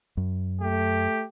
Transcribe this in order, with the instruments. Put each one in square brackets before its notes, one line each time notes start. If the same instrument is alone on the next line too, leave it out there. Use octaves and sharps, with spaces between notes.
[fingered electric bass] F#2
[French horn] A3 [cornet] G4